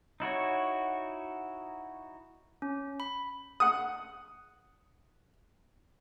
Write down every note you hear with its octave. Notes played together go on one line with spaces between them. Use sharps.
D#4 E4 F#4 C#5
C#4
B5
F#5 D#6